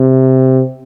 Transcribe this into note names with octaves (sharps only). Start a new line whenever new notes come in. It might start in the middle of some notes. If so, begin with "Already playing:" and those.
Already playing: C3